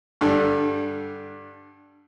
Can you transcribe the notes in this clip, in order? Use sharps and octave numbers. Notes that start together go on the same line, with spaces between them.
G2 D3 G3